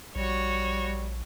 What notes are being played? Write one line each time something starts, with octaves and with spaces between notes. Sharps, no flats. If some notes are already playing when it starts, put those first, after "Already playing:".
A#1 G3 F#4 C#5